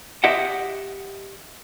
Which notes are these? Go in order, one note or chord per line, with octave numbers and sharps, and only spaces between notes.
G4 D#5 E5 F#5